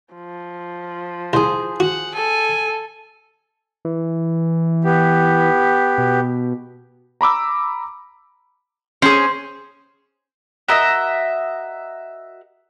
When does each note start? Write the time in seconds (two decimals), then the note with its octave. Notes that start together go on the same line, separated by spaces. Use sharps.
0.14 F3
1.33 C2 G#4 C5
1.80 F#4 F#5
2.14 A4 G#5
3.85 E3
4.84 B3 G4
5.98 B2
7.21 A#5 B5 D6 E6
9.02 C#4 G#4 C5
10.68 F#4 A#4 D#5 E5